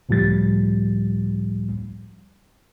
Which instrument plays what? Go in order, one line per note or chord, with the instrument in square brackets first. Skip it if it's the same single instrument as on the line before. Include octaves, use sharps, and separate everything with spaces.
[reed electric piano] C#2 A2 F3 G3 A6